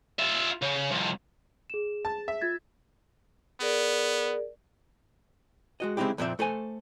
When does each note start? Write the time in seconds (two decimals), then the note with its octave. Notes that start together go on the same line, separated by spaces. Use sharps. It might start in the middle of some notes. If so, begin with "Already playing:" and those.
0.19 F4 E5
0.62 C#3
0.92 C2 F2
1.70 G#4 E7
2.05 A5
2.28 E5
2.41 F4 G#6 A6
3.61 B3 G#4 A#4 D5
5.80 G#3 F#4 D#5
5.97 C#3 G#3 C4 D#4 E4 G4
6.18 F2 A#2 F3 C4 D5 E5
6.39 A3 A4 C5 G#5